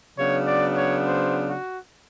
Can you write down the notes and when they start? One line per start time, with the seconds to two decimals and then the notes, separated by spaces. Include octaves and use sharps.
0.17 C#3 F#3 B3 D4 C#5
0.45 D5
0.75 C#5
1.04 C5
1.47 F#4